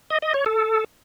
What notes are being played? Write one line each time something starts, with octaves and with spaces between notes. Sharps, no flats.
D#5
D#5
C#5
A4